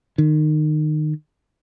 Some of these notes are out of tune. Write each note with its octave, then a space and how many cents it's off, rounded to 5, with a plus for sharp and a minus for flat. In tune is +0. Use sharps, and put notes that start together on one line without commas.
D#3 -25